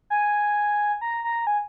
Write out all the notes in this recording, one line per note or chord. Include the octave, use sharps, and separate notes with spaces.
G#5
A#5
A#5
G#5